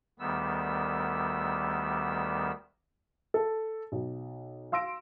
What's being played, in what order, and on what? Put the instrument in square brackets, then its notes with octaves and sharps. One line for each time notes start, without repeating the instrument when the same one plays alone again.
[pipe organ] D2 D#3 G3 B3 E6
[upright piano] A4
B1
F5 C6 E6 A#6 D7